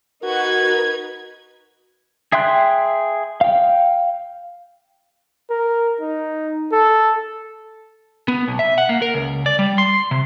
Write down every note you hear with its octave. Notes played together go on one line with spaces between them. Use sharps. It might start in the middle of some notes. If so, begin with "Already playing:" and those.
D#4 F#4 A#4 B4 G#6
G#4 E5 G5 C6 F#6
F5 G5
A#4
D#4
A4
B3
B1
E5
F#5
A#3
A#4
C#2
D5
G3
C6
C3